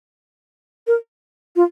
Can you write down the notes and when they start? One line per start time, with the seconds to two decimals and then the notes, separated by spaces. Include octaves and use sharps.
0.87 A#4
1.56 F4